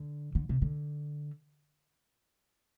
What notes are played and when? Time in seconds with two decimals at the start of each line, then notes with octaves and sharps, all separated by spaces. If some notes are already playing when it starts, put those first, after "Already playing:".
Already playing: D3
0.35 D3
0.49 C3
0.62 D3